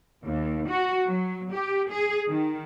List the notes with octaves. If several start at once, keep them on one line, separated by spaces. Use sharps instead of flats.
D#2
F#4
F#3
G4
G#4
D#3